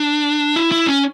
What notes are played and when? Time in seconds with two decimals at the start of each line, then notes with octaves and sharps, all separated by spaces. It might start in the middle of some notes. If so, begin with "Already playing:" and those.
Already playing: D4
0.56 E4
0.72 E4
0.87 C#4